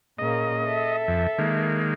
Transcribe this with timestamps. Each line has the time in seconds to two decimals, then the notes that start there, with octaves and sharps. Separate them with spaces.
0.19 A#2 C#3 A#3 D#5
0.65 A4 E5
1.08 F2
1.39 D#3 G#3 A#3